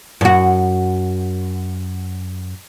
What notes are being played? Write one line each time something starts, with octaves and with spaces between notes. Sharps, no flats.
F#2 F#4